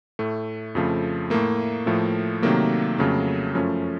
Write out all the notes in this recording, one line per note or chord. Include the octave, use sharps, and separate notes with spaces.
A2 A3
F2 C#3 F3 A3
A2 A3 A#3
A2 F3 A3
C3 D#3 F#3 A3 A#3
F2 C#3 F#3 A3
F#2 F3 A3 C#4